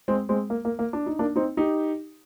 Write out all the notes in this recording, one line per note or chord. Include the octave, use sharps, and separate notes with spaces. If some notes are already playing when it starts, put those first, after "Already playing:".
G#3 C4
G#3 C4
A#3
A#3
A#3
D4
D#4
A#3 D4
C4 D#4
D#4 G4